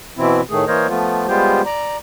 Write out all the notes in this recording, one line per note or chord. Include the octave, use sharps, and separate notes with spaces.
B2 E3 C4 E4
A2 D#3 A3 G#4
E3 A#3 A#4 C5 C#5 D#5
F3 A3 B3 F4
G3 G#3 B3 F4 G4 C5
D5 A#5